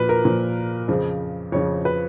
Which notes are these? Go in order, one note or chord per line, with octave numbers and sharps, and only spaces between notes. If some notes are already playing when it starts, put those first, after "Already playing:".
Already playing: A#2 F3 B4
A#4
A#2 F3
F2 C#3 F3
F2 C#3 F3 C#5
B4